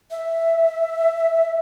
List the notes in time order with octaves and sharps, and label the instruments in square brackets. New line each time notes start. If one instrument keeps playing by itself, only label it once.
[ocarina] E5